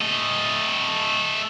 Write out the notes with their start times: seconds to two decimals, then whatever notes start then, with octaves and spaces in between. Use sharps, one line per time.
0.01 A3 D#5